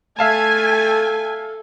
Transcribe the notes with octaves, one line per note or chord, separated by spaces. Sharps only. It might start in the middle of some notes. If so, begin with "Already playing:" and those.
A3 A4 E5 F5 G#5 A5